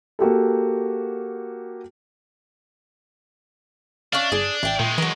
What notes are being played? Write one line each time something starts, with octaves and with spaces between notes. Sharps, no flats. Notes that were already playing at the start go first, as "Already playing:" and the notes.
A#3 F#4 G4 A4
C#4 D4 E5 F5
G1 G#4
A1 E4 G5
A#2 D#3 G#3
E3 F#3 A#4